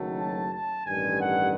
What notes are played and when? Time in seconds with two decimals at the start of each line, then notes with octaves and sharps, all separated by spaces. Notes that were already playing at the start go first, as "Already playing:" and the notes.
Already playing: F#1 F#2 D#3 F#3 A3
0.19 A5
0.52 A5
0.85 A1 G2 D#3 G#5
1.18 F#5